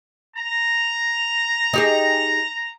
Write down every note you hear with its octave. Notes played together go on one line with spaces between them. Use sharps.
A#5
D#4 G4 G#4